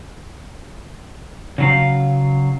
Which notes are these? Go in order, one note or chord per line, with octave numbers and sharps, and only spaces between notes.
C#3 F#3 F5